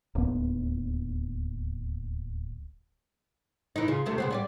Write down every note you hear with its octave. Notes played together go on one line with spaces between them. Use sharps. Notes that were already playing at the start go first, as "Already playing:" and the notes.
D1 D#2 B3
E3 D#4
C#3 F4
D2 C3 A3
C#3 B3 C4
G3 F4 D5